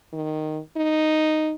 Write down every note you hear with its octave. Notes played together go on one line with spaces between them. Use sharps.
D#3
D#4